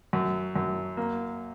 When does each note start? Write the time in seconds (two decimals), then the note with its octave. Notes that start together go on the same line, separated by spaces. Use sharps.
0.13 F#2
0.56 F#2
0.97 A#3